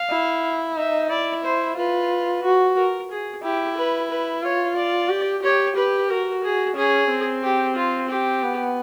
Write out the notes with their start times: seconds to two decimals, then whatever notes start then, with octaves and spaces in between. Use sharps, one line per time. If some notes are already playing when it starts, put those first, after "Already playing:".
Already playing: F5
0.10 E4
0.77 D#4 E5
1.10 E4 D5
1.44 C5
1.77 F4 B4
2.44 F#4
2.77 A#4
3.10 G#4
3.43 E4 G4
3.77 B4
4.10 B4
4.43 F4 C#5
4.76 D5
5.09 G4
5.43 G4 C#5
5.76 G4 B4
6.09 F#4 A#4
6.43 G#4
6.76 C#4 G#4
7.09 C4
7.43 G4
7.76 F4
8.09 G4
8.43 B3